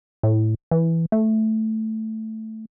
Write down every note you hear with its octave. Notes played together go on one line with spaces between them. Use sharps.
A2
E3
A3